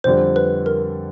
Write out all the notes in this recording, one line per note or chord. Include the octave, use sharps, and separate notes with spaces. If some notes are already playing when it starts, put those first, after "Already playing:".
F2 D3 G3 C5
B4
A#4